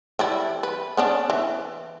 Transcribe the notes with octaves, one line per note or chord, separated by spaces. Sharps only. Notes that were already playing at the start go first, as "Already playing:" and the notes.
E3 G3 E4
B4
B3 C#4 D4
E3